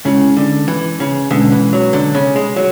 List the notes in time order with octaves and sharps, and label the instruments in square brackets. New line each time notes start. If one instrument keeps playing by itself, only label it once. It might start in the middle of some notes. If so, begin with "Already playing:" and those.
[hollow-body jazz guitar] C#3 [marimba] G#3 C#4 E4
[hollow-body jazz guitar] D3
E3
C#3
[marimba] B2 G#3 C#4 [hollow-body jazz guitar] D3
[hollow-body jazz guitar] E3
F#3
D3
C#3
G#3
F#3